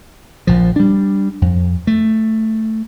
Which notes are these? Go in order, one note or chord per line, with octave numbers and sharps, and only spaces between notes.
A#1 F3
G3 D4
F2
A3